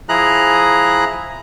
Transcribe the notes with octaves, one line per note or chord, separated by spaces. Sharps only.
F3 E4 G#4 A#5 F#6